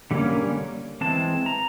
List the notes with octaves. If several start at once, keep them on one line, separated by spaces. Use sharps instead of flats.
D3 G3 A#3 C#4
E3 G#3 C4 A5
A#5